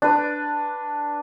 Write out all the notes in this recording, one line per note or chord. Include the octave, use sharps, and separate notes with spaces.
D4 B4